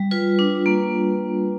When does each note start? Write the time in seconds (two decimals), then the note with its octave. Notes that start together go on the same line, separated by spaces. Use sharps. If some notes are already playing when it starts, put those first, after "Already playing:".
Already playing: G3
0.11 F4 B4
0.39 D4
0.66 A#3